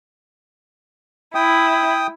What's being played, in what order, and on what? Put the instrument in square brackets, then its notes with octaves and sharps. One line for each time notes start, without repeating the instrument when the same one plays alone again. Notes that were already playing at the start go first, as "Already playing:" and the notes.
[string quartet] E4 [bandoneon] G5 D#6